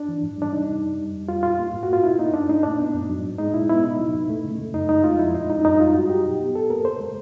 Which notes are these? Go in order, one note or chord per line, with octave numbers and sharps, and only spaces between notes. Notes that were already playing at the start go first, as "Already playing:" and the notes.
Already playing: D4
E3
G#2
G3 D4
C3 D#4
G3
F#2
G3
F2
G3 F4
A#2 F4
A#3
G#2
F#4
A#3 F4
B2 E4
A#3 D#4
G2 D4
A3 D#4
A#2 D4
B3
F#2
F#3
G#2
G#3 D#4
A#2 E4
B3 E4
C3 D#4
F#3
A#2
A3
C#3
A3
F#2 D#4
G#3 D#4
F2 F4
F3 E4
A#2 D#4
G#3 D#4
D4
F#2 D#4
G3 F4
G2 F#4
F#3 G4
B2
B3
A#2 A4
A#3 A#4
C#3 C5
G#3